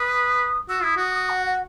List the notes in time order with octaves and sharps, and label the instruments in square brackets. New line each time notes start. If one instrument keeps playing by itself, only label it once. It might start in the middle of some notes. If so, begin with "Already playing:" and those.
Already playing: [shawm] B4 [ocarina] D#6
[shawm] F#4 [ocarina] E6
[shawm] E4 [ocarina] D#6
[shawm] F#4 [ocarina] D#6
[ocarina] D#6
F#5
F#5